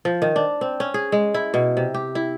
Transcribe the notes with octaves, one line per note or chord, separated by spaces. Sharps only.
F3
D#3
D4
C4
C#4
G#4
G#3
E4
B2
C3
G4
E4